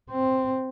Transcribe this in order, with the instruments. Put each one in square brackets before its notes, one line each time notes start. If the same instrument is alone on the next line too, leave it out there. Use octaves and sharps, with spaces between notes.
[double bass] C4